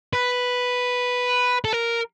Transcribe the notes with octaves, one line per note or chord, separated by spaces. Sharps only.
B4
A4
A#4